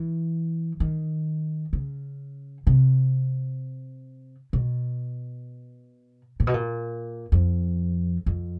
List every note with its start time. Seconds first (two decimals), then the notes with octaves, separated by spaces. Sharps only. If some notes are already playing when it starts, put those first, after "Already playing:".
Already playing: E3
0.80 D#3
1.73 C#3
2.67 C3
4.53 B2
6.40 A#2
6.47 B2
6.54 A#2
7.32 F2
8.26 F2